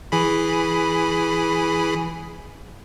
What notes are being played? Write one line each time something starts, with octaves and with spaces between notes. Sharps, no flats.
E3 G#4 B5